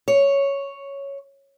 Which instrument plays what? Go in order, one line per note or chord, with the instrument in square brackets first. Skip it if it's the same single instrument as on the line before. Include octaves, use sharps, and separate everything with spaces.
[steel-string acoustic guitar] C#5